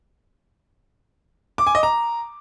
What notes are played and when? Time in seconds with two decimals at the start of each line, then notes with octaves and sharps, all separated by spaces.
1.58 D6
1.67 G#5
1.75 D#5
1.83 A#5